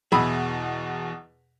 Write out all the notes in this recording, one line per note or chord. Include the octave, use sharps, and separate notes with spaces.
E2 B2 G#4 E5 B5